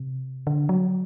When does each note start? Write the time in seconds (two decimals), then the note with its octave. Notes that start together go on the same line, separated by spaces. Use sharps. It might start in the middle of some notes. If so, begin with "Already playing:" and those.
Already playing: C3
0.47 D3
0.69 F#3